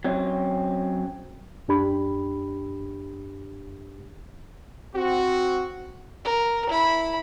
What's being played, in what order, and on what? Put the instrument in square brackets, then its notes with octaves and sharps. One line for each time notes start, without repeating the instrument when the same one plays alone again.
[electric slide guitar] F#3 C4 C#4
[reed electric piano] F#2 D4 G4 B5
[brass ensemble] C4 F#4
[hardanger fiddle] A#4
E4 B5